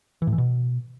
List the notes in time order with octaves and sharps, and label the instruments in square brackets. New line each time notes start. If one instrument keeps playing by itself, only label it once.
[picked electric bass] E3
A2
E3
B2